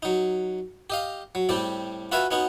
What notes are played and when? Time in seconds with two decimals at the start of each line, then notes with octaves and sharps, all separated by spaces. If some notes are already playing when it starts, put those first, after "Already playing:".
0.03 F#3 D#4
0.90 G4 D#5 F5
1.35 F#3
1.49 A2 G3 C4 G4
2.12 F4 F#4 B4 E5 F5 G#5
2.31 B3 C#4 D#4 F#4